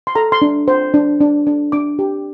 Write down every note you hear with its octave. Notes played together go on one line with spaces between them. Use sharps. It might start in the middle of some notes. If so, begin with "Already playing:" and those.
C6
A4 A#5
C6
D4
C5
D4
D4
D4
D4 D6
G4